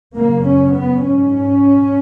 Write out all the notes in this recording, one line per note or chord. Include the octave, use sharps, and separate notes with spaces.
F#2 C#3 A#3
C#4
B3
G#2 C#4